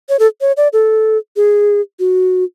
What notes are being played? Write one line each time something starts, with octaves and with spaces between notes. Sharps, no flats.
C#5
A4
C#5
D5
A4
G#4
F#4